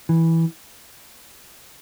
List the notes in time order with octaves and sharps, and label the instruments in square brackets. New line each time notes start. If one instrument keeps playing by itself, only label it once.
[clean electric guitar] E3